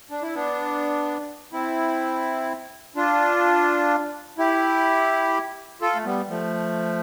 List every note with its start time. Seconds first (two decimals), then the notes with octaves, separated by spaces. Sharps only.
0.11 D4
0.22 E4
0.34 B3 D4
1.53 C4 E4
2.96 D4 F4
4.38 E4 G4
5.81 F4 A4
5.95 A3
6.05 G3 B3
6.29 F3 A3